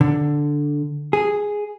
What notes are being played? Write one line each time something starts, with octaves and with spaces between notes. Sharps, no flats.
D3
G#4